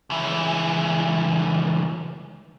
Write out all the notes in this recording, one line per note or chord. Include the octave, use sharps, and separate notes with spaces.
C#2 E3